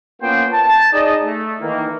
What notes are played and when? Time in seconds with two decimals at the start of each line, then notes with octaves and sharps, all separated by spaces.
0.22 A#3 B3 C#4 F4 C5 G5
0.53 A5
0.93 D#4 G#4 D5 D#5
1.23 A3
1.61 D#3 E3 A#3